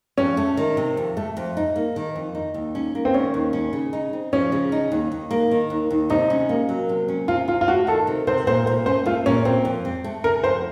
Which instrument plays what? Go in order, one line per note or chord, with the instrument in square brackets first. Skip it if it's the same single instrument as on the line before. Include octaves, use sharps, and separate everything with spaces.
[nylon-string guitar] F2 [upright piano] C#4
[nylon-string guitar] A3
D#3
C3
F2
A3
F2
D#4
A#3
D#3
F2
D#4
D#2
C#4
A#3
[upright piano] C4
[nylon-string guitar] D#3 [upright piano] C#4
[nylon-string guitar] D#2
C#4
C#3
D#4
C4
[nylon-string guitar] F3 [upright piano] C#4
[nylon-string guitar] C#3
D#4
D#2
D#2
A#3
D#3
D#2
D#2
[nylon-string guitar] C3 [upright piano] D#4
[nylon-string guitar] C#4
A#3
F#3
C3
C#4
[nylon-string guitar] C3 [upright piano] F4
[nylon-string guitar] C3 [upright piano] F4
[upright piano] F4
[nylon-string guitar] A3 [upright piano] F#4
[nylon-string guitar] D#3 [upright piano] A4
[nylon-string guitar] C3
[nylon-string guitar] C3 [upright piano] C5
[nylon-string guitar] A#2 [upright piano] C5
[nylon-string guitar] A#2 [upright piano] C5
[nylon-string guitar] C#4 [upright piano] C5
[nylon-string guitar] A3 [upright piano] F4
[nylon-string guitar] A#2 [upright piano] C#4
[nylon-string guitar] A#2 [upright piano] C4
[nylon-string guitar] F2
C4
A3
[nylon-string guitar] C#3 [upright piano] A#4
[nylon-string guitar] F2 [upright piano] C5